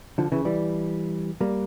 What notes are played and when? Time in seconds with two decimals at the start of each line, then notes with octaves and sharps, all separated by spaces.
0.18 D3 F3
0.32 C#3 E3
0.45 E3 G3
1.41 G3 A#3